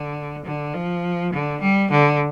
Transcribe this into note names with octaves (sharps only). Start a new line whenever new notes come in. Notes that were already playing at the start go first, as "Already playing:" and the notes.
Already playing: D3
D3
F3
D3
G3
D3